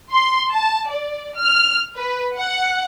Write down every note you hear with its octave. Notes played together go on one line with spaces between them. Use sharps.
C6
A5
D5
F6
B4
F#5